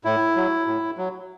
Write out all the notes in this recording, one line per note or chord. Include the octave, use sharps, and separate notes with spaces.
A2 E4
F#3
A2
F#3